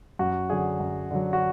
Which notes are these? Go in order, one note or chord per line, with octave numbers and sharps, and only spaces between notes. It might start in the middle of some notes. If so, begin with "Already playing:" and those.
F#2 F#4
D3 F#3 G#4
F#2
D3 F#3
F#4